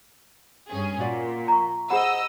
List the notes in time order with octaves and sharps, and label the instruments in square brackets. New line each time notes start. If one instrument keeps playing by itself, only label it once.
[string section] G2 C#4 G#4
[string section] A#2 [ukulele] F#4 D5
[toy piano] A#5 C#6
[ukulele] G#4 C5 F#5 [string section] D#5 E6 [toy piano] B5